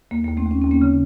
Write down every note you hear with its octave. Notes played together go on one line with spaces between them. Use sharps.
D#2 A#3
D#2 A#3
A3 C4
D#2
C#4
D#2 C4
A#3 C#4
C#3